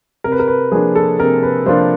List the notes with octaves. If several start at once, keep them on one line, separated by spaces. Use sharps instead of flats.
C3 A#4
B4
A#4
B4
F3 A#3 D4 F4 G#4
A4
C3 A#4
B4
F3 A#3 D4 F4 C5